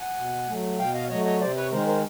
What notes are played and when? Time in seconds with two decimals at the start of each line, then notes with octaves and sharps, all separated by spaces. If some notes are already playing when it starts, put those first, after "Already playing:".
Already playing: F#5 G#5
0.16 B2
0.48 F#3 A3
0.78 B2 F5 G5
0.94 D#5 F5
1.09 F#3 A3 C#5 D#5
1.25 C#5 D#5
1.40 C3 C5 D5
1.56 B4 C#5
1.71 D#3 G#3 A#4 C5
1.87 A#4 C5